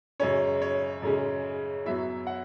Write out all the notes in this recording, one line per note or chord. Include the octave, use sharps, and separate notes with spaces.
F#2 C#3 G#3 C#4 C#5
C#5
F#2 C#3 G#3 C#4
F#2 F#3 B3 E4 E5
F#5